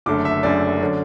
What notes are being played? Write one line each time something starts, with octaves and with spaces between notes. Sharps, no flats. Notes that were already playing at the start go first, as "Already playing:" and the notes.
F#1 F#2 D3 A3 D6
E5
F#1 F#2 D3 A3 D5
D3 F#3 C#4